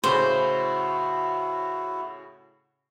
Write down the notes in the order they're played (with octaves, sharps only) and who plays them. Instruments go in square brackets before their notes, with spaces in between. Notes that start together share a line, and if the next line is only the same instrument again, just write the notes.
[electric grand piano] A2 C#3 B5 [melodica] E4 F#4 [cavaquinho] C5